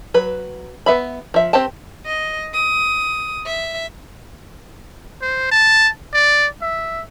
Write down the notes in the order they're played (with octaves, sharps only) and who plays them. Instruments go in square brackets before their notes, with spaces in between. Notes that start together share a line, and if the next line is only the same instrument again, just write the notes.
[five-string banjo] F#3 B4
B3 E5 B5
F3 E5
C4 G4 C5 G5 A5
[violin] D#5
D#6
E5
[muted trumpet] C5
A5
D5
E5